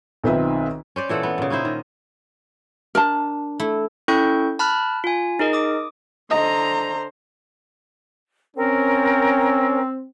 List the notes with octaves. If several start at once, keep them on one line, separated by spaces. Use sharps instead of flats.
B1 D#3 C4 F4 B4 E5
C#4 C5 D5
A#2 E3 A4 F#5
B3
A#2 C#3
C#4 D#4 E4 C5
D#3
D4 A#4 A5
A3 E4
C#4 E4 A4 G5 C#6 G6
A5 B5 F6 F#6
F4 G#5
D#4 G#4 A#4 D#5
D6 D#6
D3 C5 D#5 A#5
C4 C#4 A#4